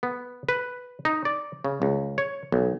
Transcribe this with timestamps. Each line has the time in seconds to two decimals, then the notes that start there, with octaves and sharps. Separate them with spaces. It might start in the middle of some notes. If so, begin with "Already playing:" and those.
0.03 B3
0.49 B4
1.05 D#4
1.25 D5
1.64 C#3
1.82 C#2
2.18 C#5
2.52 B1